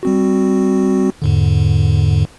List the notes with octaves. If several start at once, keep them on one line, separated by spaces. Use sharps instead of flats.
G3 C4 F#4
E2 G#2 D3